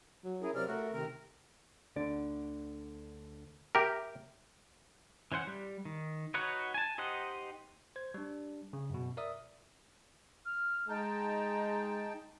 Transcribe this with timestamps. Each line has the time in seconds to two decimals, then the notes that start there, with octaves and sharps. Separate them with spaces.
0.24 F#3
0.42 C#4 E4 G#4 A#4
0.55 C3 F#3 A#4 D5 F6
0.68 A3 F#4 A#4
0.92 C3 D#3 C4 A#4
1.96 D2 D3 D5
3.75 G4 A#4 E5
5.32 E3 C#4 C5 F#5
5.47 G3
5.85 D#3
6.34 D#4 F#4 B4 C#5 F#5
6.74 G#5 A5
6.98 D#4 G4 C5 D#5 F#5
7.96 C5 G#6
8.14 G3 D4
8.73 C#3
8.90 F#2 B2
9.17 A#4 D5 E5 D#6
10.45 F6
10.89 G#3 D#4 G5 A5 A#5